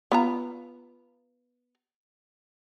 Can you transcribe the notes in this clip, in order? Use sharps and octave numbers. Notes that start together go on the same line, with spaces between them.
B3 F4 A#5